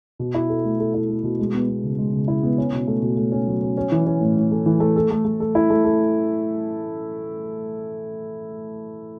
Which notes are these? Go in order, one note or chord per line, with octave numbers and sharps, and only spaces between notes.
B2
E4
A4
A3
A4
E4
A3
B2
G#3
B3
B3
C#3
G#3
C#3
E4
B3
C#4
B2
A3
B2
A3
C#4
F#3
C#4
C#4
E3
C#4
A2
A2
A3
E3
A3
A4
A3
A3
A4
E4
A3
A4